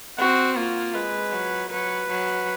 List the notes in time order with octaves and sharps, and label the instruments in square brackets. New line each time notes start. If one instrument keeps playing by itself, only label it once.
[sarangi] C4 [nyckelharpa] F#4
[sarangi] A#3 [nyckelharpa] F4
[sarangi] G#3 [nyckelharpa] B4
[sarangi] F#3
[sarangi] F#3 [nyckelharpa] B4
[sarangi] F#3